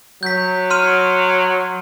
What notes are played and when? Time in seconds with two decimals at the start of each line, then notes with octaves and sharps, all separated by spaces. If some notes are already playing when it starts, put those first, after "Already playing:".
0.23 F#3 G6 B6
0.70 C6 F6 D#7